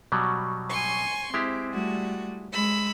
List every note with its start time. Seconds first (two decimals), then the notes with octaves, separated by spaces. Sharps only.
0.12 B2 F#3 G3
0.70 G#5 C6 C#6
1.34 G#3 C4 E4 G4
1.70 G3 A3 F#4
2.52 G#3 B5 E6